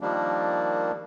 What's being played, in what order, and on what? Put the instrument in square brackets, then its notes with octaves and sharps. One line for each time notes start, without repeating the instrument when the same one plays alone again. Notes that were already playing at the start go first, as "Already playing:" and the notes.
[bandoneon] D#3 F3 G3 A#3 D4